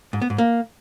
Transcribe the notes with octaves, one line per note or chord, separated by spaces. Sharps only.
G#2
B3
G#2
A#3